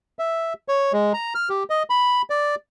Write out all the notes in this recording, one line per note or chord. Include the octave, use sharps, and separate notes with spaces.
E5
C#5
G#3
A#5
F6
G4
D#5
B5
D5